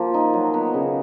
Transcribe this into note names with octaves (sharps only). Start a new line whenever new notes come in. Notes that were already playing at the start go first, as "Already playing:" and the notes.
Already playing: F3 A#3
D#4
F#3
B3
C#3